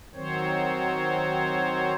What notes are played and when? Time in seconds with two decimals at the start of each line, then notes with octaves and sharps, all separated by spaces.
0.15 D#3 F#3 C4 C5 C#5